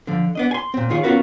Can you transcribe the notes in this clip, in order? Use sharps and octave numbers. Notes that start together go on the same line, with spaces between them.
D3 F3
B3 D4 D#5
G#5 C6
A#2 C4
D#3 F4 G#4 C#5
B3 C#4 F4 F#4 A#4 B4